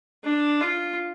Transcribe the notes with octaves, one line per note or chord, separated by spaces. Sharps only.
D4
F4